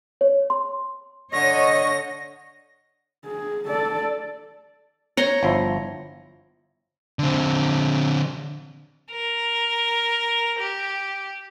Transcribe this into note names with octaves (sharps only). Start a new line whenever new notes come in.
C#5
C6
D3 C#5 D#5 C#6 A#6
G#4
A4 D5
C#5 A#5 C6
G1 F3 E4
D3 C4
A#4
G4